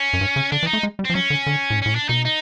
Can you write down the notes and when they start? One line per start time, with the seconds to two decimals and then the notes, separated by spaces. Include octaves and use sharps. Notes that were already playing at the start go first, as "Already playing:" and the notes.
Already playing: C#4
0.13 F#2
0.21 G2
0.36 C#3
0.52 D3 D4
0.63 E3
0.67 D#4
0.73 A3
0.83 G#3
0.99 G3
1.05 C4
1.10 F3
1.15 F#3 C#4
1.30 D3
1.47 D3
1.70 A2
1.77 G#2
1.82 A2 C#4
1.94 A#2 D4
2.09 B2 D#4
2.25 D#4